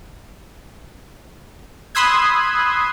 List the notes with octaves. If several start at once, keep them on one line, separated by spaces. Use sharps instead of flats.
B5 C6 D#6 E6 F#6 G#6